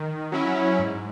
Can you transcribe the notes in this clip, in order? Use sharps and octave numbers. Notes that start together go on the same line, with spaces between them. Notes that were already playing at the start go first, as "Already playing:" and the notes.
Already playing: D#3
F#3 C#4 E4
G#2